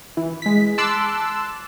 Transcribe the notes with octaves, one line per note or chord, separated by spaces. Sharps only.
E3
G#3 B6
A5 C6 D6 E6 F#6